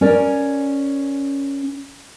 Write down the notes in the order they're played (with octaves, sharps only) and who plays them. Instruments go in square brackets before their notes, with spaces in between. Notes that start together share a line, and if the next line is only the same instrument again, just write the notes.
[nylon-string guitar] C#4 A#4 D5